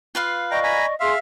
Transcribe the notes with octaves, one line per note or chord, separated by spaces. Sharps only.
F4 B4 F5
D5 D#5 G5 A#5 C#6
G#5 A#5 B5
G#4 E5 F5 C6